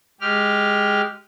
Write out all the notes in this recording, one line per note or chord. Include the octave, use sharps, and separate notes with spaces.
G#3 G4 F6